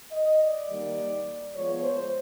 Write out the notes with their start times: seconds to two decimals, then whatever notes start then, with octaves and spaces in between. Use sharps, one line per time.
0.11 D#5
0.40 D5
0.69 D#3 G3 A#3
1.55 F3 G#3 B3 C#5
1.83 C5